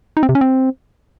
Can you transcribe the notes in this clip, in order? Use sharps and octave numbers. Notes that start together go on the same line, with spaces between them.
D#4
C4
C3
C#4
C4